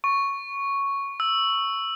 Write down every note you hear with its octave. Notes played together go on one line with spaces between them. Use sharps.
C#6
E6